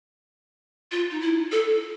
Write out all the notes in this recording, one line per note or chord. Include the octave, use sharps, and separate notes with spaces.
F4
D#4
E4
A4